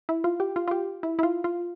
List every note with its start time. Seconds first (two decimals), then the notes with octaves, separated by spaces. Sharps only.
0.09 E4
0.24 F4
0.40 G4
0.56 F4
0.68 F4
0.71 G4
1.03 E4
1.19 E4
1.23 F4
1.44 F4